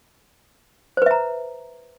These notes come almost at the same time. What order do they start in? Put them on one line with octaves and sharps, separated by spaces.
C5 B4 E5 A#5